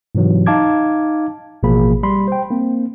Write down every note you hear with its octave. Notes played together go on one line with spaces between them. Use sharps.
G#2 C3 E3 F#3
D#4 F5 A5 D6 G#6
A1 B2 F3 A#3 G#4 B5
G3 B5 C6
C5 G5
A#3 C4